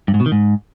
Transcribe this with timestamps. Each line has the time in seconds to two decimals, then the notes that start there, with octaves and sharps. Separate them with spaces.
0.08 G2
0.14 G#2
0.20 B2
0.26 D#3
0.32 G#2